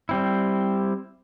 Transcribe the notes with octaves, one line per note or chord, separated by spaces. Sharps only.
G3 C4 E4